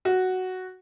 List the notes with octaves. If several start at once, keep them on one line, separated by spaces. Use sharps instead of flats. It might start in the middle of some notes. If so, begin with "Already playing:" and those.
F#4